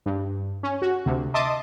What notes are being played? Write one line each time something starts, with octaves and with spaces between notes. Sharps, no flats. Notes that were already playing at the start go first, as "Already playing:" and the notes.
G2
C#4
F#4
D2 C3
D#5 E5 A5 C6 D6 D#6